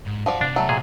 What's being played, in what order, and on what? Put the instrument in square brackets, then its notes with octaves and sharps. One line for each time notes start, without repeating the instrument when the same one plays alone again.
[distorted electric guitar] G#2
[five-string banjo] F3 F#4 D5 [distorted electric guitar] D#5 F5
[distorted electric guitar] C3 B3 [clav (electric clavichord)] D4
[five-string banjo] F#3 A3
[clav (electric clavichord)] A#2 G#4